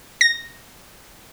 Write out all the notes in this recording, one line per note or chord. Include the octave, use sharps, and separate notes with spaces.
A#6